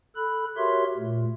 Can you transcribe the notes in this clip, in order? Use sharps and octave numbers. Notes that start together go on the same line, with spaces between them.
A4 B5 F#6
F#4 G4 A#4 C#5 E5 C6
A#2 A3